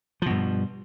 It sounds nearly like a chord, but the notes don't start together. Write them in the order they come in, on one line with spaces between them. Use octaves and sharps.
F3 B2 G2